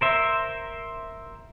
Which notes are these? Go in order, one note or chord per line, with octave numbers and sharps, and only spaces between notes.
A#4 C5 E5